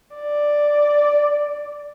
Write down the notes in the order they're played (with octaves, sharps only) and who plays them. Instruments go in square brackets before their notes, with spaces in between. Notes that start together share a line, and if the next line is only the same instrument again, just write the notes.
[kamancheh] D5